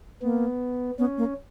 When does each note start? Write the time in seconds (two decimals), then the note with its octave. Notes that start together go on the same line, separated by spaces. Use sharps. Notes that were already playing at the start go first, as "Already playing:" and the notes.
0.22 A#3 B3
0.99 B3 C#4
1.18 A#3